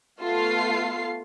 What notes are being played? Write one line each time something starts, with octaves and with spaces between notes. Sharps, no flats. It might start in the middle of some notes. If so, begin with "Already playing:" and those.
A3 B3 F4 A4 F5 C7